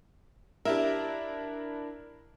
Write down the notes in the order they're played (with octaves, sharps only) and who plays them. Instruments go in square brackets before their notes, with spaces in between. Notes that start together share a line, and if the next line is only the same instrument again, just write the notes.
[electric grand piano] D4 E4 A#4 [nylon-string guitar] G4 E5